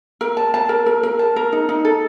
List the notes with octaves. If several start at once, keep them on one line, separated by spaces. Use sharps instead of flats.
A#4
A5
A5
A#4
A#4
A#4
A5
A#4
D#4
D#4
A4